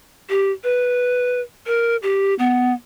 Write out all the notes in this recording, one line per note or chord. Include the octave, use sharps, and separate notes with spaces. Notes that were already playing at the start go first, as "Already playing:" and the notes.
G4
B4
A#4
G4
B3